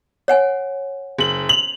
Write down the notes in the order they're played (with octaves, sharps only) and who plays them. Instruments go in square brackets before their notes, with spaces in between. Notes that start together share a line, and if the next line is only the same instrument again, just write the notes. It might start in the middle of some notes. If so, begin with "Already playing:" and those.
[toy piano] C#5 F#5 G#5
[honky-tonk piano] F#1 F#7
F7 F#7